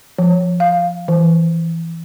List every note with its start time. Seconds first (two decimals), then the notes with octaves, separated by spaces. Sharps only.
0.19 F3
0.60 F5
1.08 E3